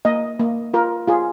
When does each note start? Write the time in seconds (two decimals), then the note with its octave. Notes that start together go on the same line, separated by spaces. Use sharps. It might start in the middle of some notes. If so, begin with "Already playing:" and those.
0.05 A#3 D#5
0.39 A#3
0.74 F4 A#4
1.08 F4 G#4